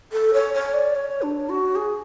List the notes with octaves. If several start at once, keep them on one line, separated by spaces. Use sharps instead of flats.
A4
C#5
C#5
D5
C#5
D4
F#4
G#4